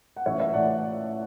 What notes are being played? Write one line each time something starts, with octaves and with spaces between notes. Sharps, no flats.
F#5
A1 C#5 E5
C#5 E5
A2 E3 D5 F#5